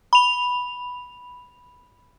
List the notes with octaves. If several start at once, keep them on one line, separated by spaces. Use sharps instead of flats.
B5 F7